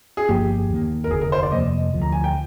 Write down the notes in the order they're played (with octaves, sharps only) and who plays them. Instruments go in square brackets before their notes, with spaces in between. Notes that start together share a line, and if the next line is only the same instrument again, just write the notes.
[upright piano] G#4
[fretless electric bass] G1 G2 F3 A#3 [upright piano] G4
[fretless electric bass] D#2 D#3 A#3
[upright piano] A#4
[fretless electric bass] F1 D#2 D3 [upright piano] G#4
[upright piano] A#4
C5
D5
[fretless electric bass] F2 C3 F3 A#3 [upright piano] D#5
[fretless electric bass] D2 D3 F3
[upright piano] A#5
G#5
G5